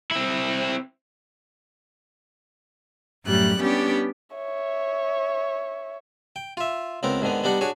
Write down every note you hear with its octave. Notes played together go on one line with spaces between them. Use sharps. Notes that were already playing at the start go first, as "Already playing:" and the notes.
C4 E4
F#2 A2 G3 F#6
G3 B3 C#4 D4 G4
C#5 E5
G5
F4 E5
C#2 B3 C4 A#4
G#2 D3 D#3 B3
G3 B3 D4 D#4 F#5
D4 F#4 G#4 C#5